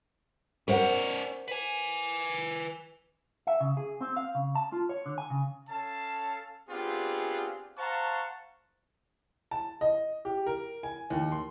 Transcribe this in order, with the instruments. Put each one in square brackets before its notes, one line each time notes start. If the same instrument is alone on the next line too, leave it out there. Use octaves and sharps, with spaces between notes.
[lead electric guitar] C#4 D5 [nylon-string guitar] A#4 C5 F#5
[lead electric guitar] B4 G#5
[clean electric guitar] E5
C#3
G#4
C4
F5
C#3
A5
F4
C#5
D3
G#5
C#3
[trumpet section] C#4 A4 F5 A5
B3 C4 D4 F4 G4 G#4
C5 F5 F#5 A5 A#5 C#6
[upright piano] A5
D#5
G4
A#4
G#5
D#2
C6